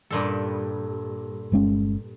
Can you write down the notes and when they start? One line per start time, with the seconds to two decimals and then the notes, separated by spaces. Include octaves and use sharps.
0.10 G2 A#2 A4
1.52 G1 G#3 C#4